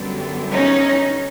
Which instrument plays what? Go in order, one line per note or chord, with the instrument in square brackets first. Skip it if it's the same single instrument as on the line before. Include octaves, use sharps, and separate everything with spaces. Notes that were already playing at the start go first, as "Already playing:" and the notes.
Already playing: [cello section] F#2 D3 G3 B3
C#4 D#4